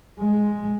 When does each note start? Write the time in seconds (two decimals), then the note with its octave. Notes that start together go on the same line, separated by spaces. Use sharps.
0.19 G#3